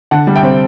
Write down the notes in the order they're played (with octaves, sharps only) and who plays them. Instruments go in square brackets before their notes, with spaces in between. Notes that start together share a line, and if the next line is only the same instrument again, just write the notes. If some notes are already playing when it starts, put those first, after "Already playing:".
[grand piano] D3 F#5 A5
G3
E5 G5
C4